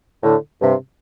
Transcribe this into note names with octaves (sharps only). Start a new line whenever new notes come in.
A2 D3
G2 C3